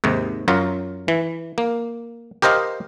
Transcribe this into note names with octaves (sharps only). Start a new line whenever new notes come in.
D#2 G#2 C3
F#2 F#3 F4 A#5
E3
A#3
G4 A#4 C5 D#5 F5